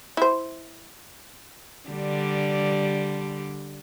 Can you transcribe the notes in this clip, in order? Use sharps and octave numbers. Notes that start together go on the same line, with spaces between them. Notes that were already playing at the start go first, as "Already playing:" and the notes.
E4 C5
D3 G3